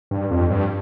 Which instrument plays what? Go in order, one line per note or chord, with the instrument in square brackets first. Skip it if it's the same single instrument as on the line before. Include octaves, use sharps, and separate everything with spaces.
[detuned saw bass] G2
F2
G2